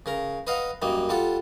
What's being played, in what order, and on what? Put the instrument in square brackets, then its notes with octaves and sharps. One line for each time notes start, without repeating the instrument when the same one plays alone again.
[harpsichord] C#3 A#4 A#5
B4 D#5 F5 F#5 A#5
F#2 G3 A#3 D#4
G3 F4 A4 F#5